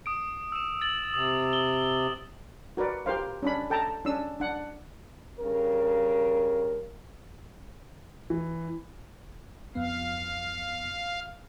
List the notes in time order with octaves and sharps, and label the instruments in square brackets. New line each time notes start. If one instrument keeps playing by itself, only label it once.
[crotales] D#6 D7
E6 E7
A6 F#7
[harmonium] C3 [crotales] D#6
[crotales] D#6 G7
[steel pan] F#4 A#4 B4 D5
G4 A#4 C5 F5
C#4 D4 B5
A4 G5 A5 A#5
C#4 D4 E6
D4 F#5
[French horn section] G2 C#3 A#4
[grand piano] E3
[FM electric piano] F2 B3 [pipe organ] F5